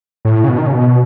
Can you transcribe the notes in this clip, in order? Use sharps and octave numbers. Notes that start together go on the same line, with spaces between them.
A2
C#3
B2
D#3
C#3
B2